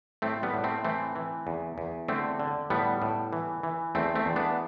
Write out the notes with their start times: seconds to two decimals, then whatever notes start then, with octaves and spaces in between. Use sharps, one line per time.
0.22 A2 A3 C4
0.43 G3 B3
0.54 A2
0.64 A3 C4
0.84 E3 A3 C4
1.16 E3
1.47 E2
1.78 E2
2.08 D3 A3 C4
2.40 D3
2.70 A2 G3 B3
3.02 A2
3.33 E3
3.63 E3
3.95 E2 A3 C4
4.15 A3 C4
4.26 E2
4.36 B3 D4